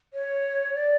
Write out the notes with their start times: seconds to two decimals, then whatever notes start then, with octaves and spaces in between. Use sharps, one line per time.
0.14 C#5
0.74 D5